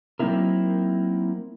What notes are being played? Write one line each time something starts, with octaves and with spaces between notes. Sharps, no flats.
F#3 A#3 C4 D#4 E4 A#4